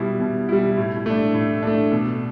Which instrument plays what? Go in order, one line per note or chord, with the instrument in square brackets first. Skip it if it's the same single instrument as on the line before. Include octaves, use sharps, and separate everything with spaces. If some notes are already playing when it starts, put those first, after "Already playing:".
Already playing: [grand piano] B2 G3 E4
B2
G3 E4
A2
A3 D4
A2
A3 D4
B2